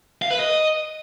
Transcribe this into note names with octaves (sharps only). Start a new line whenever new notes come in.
F5
B4
D#5